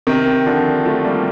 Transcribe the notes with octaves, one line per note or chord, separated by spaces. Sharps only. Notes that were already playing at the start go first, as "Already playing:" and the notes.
C3 D#3
D3 F3
F3 A3
G3 A#3